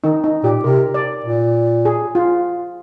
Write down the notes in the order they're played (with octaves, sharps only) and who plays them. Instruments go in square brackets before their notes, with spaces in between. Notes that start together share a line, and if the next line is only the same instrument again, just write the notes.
[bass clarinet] D#3 [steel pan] D#4
[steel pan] D#4
[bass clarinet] A#2 [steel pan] G4
[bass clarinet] C3 [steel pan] A#4
[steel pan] D5
[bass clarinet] A#2
[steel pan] G#4
F4